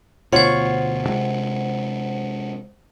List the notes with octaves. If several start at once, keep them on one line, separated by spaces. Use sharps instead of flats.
D2 B2 F4 C5 C#5 F#5 C#6
C3 G#3